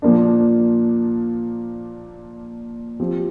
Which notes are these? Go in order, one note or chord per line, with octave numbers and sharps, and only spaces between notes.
A#2 F3 A#3 D4
F3 C4 G4